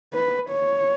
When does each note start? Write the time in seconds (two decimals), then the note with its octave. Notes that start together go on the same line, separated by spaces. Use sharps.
0.14 B4
0.50 C#5